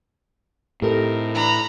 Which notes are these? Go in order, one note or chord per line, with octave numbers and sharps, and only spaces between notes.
A2 C4 D#4 G4 A4 A#4
E3 D4 A#5 B5